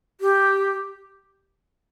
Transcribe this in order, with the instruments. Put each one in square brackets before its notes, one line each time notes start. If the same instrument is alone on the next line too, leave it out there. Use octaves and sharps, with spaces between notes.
[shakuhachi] G4